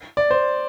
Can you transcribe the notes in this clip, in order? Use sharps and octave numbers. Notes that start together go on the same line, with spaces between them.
D5
C5